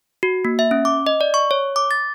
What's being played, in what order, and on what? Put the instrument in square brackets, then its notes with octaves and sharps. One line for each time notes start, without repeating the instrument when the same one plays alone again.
[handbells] F#4
A#3
E5
C#4
D6
D#5
D5
C#6
C#5
D6
A6